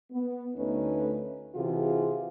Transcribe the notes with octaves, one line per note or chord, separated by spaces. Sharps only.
B3
D2 A3 C#4 D#4 B4
C3 E3 F4 F#4 G#4